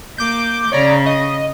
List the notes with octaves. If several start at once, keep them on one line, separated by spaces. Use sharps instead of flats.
A#3 D6 G6
C#3 C#5 D5 A#5
D#5